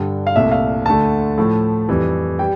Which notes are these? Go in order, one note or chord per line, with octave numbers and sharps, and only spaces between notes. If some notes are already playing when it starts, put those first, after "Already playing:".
Already playing: G2 D3 G3 G5
F5
C2 A#2 A3 E5
F5
D2 D3 A3 A5
A2 F3 A3
F2 E3 G3
G3 G5